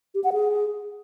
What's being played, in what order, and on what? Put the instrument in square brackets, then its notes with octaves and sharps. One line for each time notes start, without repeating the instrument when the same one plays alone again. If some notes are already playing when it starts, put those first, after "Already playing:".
[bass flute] G4
F#5
G#4